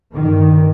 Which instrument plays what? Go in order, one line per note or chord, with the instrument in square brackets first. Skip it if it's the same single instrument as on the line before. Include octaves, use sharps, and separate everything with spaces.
[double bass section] G2 D#3